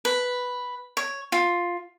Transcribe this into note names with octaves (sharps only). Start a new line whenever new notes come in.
B4
C#5
F4